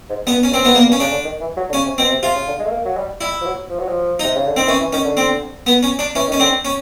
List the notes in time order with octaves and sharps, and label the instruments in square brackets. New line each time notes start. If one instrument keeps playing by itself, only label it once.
[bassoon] G#2
[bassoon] G2 [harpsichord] B3
[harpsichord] C#4
[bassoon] G2
[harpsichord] C4
[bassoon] G#2 [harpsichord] B3
[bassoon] G2 [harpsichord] A#3
[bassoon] G2
[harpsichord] C#4
[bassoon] C#3 [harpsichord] D4
[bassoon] D3
D#3
E3
F#3
D3
[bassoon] C#3 [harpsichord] C#4
[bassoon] C3
[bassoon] B2 [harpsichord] C4
[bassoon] C3
[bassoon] C3 [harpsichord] F4
[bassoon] C#3
D3
G#3
A3
A#3
F#3
G3
[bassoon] G3 [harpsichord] E4
[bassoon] F3
F#3
F3
F#3
F3
[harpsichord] D#4
[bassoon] C3
C#3
D3
[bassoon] D#3 [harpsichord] C4
[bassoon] E3 [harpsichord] C#4
[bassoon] E3
[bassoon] D#3 [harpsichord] C#4
[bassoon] D3
[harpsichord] C4
B3
C#4
D4
[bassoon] E3 [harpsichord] C#4
[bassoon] D#3
[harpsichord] C#4
[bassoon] D3 [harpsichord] C4
[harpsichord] C#4